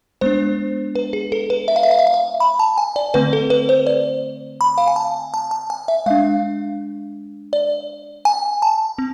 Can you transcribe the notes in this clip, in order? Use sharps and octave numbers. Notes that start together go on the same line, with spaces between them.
G#3 B3 D4 C5
B4
G#4
A4
B4
E5
F5
E5
F5
E5
F5
E5
B5
A5
G#5
D5
D3 A3 C4 B4
A4
B4
C5
D5
B5
F5
G#5
A5
A5
A5
G#5
E5
G#3 D4 F5
D5
G#5
A5
C4